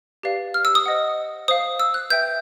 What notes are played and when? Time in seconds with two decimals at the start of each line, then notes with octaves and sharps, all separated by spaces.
0.23 G4 B4 D5 F5
0.54 F6
0.65 E6
0.75 D#6
0.86 C5 D#5 F#5
1.48 C5 F5 D#6
1.80 E6
1.94 F#6
2.10 B4 E5 G5 G6